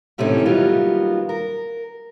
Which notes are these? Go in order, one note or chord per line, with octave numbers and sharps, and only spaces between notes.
A2 C3 D#3 E3 A3 C#4
D#3 F#3 G3 A#3 B3 F4
A#4